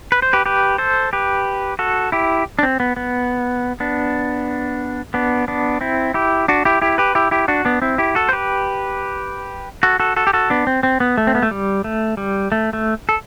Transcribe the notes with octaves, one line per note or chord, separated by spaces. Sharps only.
B4
C5
G4 B4
G4 B4
A4 C5
G4 B4
F#4 A4
E4 G4
D4
C4
B3
B3
B3 D4
B3 D4
B3 D4
C4 E4
E4 G4
D4 F#4
E4 G4
E4 G4
G4 B4
E4 G4
E4 G4
D4 F#4
B3 D4
C4 E4
E4 G4
F#4 A4
C5
G4 B4
F#4 A4
F#4 A4
F#4 A4
G4
F#4 A4
B3 D4
C4
C4
B3
A3
C4
B3
A3
G3
A3
G3
A3
A3
A4